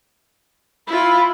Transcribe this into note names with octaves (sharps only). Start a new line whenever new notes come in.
E4 F4 B5